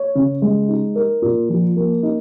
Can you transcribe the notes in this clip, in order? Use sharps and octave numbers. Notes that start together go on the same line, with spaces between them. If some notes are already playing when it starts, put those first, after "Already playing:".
Already playing: C#5
C#3
G#3
D#4
A#4
A#2
F3
A#3
D#4